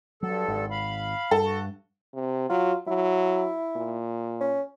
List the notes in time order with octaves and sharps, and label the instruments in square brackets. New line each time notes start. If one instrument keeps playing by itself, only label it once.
[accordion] G2 A4 [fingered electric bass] F#3
[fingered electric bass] G#1
[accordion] F5 B5
[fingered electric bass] G2 [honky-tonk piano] A4
[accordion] F#4
[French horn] C3
[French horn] F#3 [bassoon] F4
[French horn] F#3 [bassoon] E4
[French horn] A#2
[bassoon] C#4